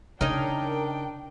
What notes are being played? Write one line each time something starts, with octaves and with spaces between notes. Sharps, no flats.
C#3 D4 D#4 A#4 C#5 D#5 G5